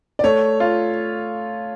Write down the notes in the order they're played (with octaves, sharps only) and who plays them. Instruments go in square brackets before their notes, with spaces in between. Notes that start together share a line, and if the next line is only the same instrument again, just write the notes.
[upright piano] D5
[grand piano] A3 [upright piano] C#5
[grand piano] F4